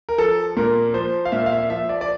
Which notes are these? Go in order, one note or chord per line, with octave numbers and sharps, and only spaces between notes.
A#4
F3 A4
A#2 A#4
F3 C5
F5
A#2 E5
F5
E5
F3 E5
D5
D5